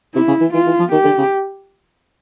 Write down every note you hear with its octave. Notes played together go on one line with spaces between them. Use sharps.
C3 E4
C#3
E3
E3 F4
E3
F3
D#3 G4
D3
C#3